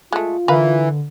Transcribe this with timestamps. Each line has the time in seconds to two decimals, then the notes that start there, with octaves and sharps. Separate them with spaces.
0.12 G#3 A3 F4
0.48 D3 E3 A#4 B4 F5